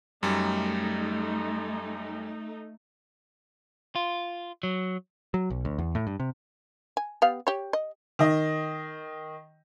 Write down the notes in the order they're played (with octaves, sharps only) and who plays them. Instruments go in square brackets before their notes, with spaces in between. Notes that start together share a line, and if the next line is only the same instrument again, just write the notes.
[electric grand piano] F#2 G3 [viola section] A3 D#4
[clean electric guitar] F4
F#3
[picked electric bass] F#3
B1
D2
E2
A2
G2
C3
[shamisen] G#5
B3 G4 F5
G4 C#5
D#5
[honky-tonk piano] D#3 D#5